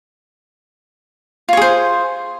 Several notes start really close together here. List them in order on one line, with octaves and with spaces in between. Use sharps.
F4 C#5 G#4 C5